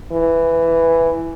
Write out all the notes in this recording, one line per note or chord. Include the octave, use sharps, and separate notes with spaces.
E3